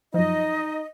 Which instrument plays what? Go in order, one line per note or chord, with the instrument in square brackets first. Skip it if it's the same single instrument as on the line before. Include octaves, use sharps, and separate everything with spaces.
[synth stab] F#2 F3 [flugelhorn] D#4 [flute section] D#5